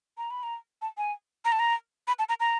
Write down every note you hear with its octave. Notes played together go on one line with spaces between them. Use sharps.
A#5
B5
A#5
A5
G#5
A#5
A5
A#5
B5
A5
A#5
A#5